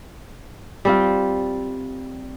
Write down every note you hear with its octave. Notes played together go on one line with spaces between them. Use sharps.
G3 C4 F4